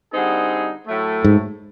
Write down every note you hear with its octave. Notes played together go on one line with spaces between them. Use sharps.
D3 G3 C4 D#4 G#4
A2 F#3 A3
G#2